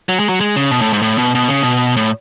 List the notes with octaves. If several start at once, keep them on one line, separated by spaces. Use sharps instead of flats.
F#3
G#3
F#3
G#3
C#3
B2
A2
G#2
A2
B2
B2
C#3
B2
A2